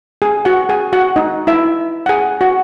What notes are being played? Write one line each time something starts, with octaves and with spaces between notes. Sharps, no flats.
G#4 G#5
F#4 F#5
G#4 G#5
F#4 F#5
D#4 D#5
E4 E5
F#5
G#4 G#5
F#4 F#5